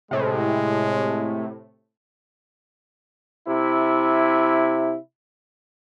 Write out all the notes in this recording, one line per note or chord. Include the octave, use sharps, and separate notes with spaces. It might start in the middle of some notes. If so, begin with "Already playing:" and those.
A2 C3 G#3
C3 E4